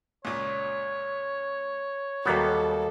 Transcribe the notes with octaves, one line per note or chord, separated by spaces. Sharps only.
C#2 A#2 C#5
D#2 F#3 G3 A#3 B3 F#4 A4